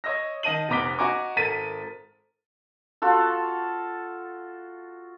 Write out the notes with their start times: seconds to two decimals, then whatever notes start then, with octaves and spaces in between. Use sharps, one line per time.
0.04 C#5 D#5 E6 A#6
0.43 D#3 D#5 A5 D#7 F#7
0.69 F1 B3 A#5 D6 B6 G7
0.99 F#4 D#5 G#5 A#5 C#6 D6
1.37 G#1 A4 A#4 A6 B6 D#7
3.02 F4 F#4 A4